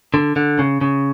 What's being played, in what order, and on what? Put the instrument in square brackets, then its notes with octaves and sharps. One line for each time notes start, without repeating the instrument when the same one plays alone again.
[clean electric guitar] D3
D3
C#3
C#3